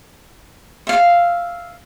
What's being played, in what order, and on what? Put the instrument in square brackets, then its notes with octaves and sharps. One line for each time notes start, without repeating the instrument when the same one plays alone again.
[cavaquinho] E5 F5